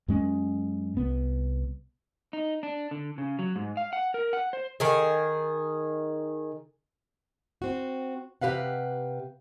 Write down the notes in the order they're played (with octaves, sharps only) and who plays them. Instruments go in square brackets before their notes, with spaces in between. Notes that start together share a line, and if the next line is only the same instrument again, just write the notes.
[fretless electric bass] F#2 G#3 C#4
C2 B3
[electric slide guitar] D#4
D4
D3
C#3
F#3
G#2
F5
F#5
A#4
F#5
C5
[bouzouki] D#3 G#4
[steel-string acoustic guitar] C4 F#4
C3 G4 B4 F5 F#5